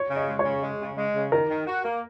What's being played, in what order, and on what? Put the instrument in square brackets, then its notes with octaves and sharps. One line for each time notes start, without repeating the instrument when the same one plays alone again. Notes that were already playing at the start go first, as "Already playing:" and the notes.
Already playing: [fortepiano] C#5
[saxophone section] C#3
[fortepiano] D#5
[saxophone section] G#3
[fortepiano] C#5
[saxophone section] C#3
G#3
C#3
G#3
C#3
[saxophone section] D#3 [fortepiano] A#4
[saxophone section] D#3
F#4
A#3